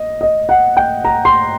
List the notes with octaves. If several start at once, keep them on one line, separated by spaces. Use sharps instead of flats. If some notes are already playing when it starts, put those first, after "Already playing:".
Already playing: D#5
D#5
F#5
G5
A#5
C6